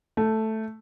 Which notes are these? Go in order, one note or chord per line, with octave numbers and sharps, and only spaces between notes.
A3